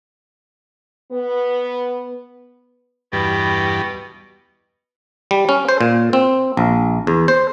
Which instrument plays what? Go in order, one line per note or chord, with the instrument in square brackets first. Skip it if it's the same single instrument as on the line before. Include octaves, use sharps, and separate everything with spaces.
[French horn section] B3
[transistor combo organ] E2 G2 G3 [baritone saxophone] B2
[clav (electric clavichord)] G3
C#4
C5
A#2
C4
A#1
E2
C5